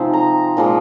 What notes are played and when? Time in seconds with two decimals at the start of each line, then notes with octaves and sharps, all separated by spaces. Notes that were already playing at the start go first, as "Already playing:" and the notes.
Already playing: C3 F3 G#3 C4 D#4
0.13 A#5
0.57 A#2 F3 G#3